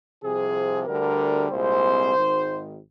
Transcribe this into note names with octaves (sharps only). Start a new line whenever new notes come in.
C2 C3 F3 G#4
D2 D3 G3 A#4
C2 A#2 G#3 C4 C5
G#1 G#2 D#3